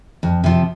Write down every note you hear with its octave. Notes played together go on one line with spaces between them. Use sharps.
F2
C3 F3